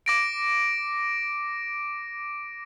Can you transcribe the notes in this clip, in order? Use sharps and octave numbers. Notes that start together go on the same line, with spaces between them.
D6 A#6 D7